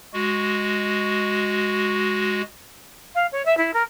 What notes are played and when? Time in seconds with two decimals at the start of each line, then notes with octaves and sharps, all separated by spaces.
0.13 G#3 F#4
3.15 F5
3.32 C#5
3.45 E5
3.57 E4
3.73 A#4